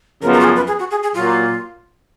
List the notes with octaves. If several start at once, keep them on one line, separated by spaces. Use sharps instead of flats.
F#2 C#3 F3 B3 F4 A#4
A#4
F#4
G#4
B4
G#4
F#4
G#4
G#4
A#2 F#3 A#3 F4